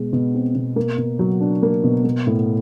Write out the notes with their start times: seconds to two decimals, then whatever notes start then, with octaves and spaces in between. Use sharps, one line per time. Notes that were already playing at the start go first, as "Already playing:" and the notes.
Already playing: B2 G#3
0.13 B2
0.34 C4
0.55 B2
0.76 A#3
0.98 B2
1.19 F#3
1.40 D4
1.63 A#3
1.84 B2
2.05 A#3
2.27 A2